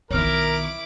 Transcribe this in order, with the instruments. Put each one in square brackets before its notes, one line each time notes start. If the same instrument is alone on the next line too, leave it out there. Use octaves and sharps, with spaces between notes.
[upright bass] B1 D#3 [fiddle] E4 D6 [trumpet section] A#4 [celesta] C#5 F6